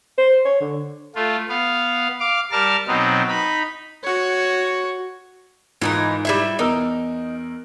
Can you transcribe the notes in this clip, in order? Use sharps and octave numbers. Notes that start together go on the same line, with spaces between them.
C5
C#5
D3
A3 F4
B3 F5
F5 D6
G3 A#4 A5 F6
B2 F#3 B3 C4 D#4
D#4 B5
F#4 C#5
G#2 E3 D#4 F4 A#4
G3 E4 E5
E2 D#4 A#4 E6